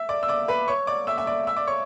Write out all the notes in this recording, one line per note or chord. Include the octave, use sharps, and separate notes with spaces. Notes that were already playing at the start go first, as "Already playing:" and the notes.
Already playing: E5 E6
D5 D6
E6
D5 D6
B4 B5
C#5 C#6
D5 D6
E5 E6
E5 E6
D5 D6
E5 E6
D5 D6
C#5 C#6